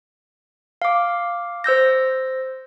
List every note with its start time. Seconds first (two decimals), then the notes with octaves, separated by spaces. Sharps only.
0.82 F5 D6
1.64 C5 E6 G6 A#6